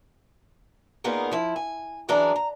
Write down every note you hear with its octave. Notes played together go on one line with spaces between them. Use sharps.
A#2 A#3 B3 D#4 G#4 A#4
F3 E4
G#5
F#2 E3 D4 G#4 D5 A#5
A#5